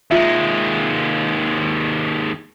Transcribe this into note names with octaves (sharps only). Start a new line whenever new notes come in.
D#2 G#3 F4 E5